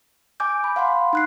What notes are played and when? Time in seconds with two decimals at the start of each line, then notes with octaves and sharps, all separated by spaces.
0.40 G#5 D6 G6
0.64 B5
0.76 F5 F#5 B5 C6
1.13 D#4 F#6 C7